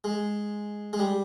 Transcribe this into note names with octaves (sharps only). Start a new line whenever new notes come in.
G#3
G#3
G3